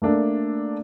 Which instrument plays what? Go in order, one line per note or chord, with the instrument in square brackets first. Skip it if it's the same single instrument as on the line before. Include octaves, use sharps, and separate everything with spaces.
[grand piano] A3 A#3 D4 A4